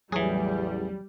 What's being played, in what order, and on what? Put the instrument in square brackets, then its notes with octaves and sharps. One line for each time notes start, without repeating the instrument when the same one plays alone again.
[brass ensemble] A1 E2 [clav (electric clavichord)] E3 G#4 [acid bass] F#3 [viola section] G3